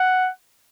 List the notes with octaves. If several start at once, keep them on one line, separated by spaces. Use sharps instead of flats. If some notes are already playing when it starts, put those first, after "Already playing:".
Already playing: F#5